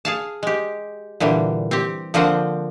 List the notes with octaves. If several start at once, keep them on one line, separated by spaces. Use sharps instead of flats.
G#4 F5 A5
G#3 G4
A#2 D3 E3 G3
C4 G4
D3 F3 A#3 C4 C5 F#5